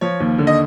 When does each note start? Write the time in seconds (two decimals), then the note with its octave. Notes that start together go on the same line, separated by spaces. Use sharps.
0.01 F3 C#5
0.20 D#2
0.38 D3
0.47 D#5